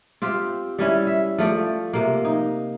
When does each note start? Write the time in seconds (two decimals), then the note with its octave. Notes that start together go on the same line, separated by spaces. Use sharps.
0.22 C4 F4 G4
0.79 G3 C#4 E4
1.07 E5
1.38 F3 A3 A4 D5
1.93 C3 A#3
2.25 D#4